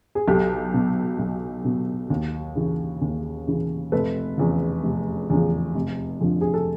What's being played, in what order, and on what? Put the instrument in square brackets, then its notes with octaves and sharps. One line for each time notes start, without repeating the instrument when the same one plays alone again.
[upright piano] G#4
B1 G4 A4
B2
B1
B2
D#2
C#3 E3
D#2
C#3 E3
F1 A4 B4
E2 C#3 F3
F1
E2 C#3 F3
F1
F2 D3 F3
G#4
A4